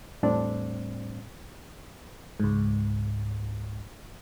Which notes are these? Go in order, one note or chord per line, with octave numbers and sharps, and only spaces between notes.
E2 A2 G3 C4 D4
C#2 G#2